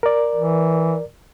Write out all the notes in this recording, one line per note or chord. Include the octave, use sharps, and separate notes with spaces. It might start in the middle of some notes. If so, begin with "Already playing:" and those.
A#4 D5
E3